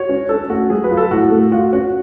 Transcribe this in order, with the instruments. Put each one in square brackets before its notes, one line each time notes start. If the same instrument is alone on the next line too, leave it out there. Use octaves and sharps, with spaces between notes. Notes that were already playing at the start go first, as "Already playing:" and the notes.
Already playing: [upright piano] F#4 [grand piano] C#5
[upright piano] C#4
[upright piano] C#4 [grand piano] A4
[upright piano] A3 [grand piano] F#4
[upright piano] F#3 [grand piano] G#4
[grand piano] B4
[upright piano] F4
[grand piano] A4
[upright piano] A2 [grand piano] F#4
[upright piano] A3
[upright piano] F4 [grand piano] F#4
[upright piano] C#4 [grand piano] F#4